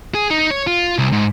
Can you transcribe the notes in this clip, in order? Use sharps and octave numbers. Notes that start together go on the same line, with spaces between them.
G#4
D#4
C#5
F4
C2
G#2